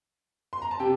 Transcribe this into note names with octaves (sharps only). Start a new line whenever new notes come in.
C6
A#5
A5
C3 G4 G5